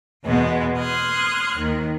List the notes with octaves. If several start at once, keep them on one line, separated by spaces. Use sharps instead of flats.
E2 B2 G#3 B3
C6 D#6 F6 F#6 G#6
D#2 D#3